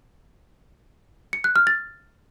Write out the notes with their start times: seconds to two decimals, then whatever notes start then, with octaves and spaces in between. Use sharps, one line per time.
1.33 C#7
1.44 F#6
1.56 F6
1.67 A6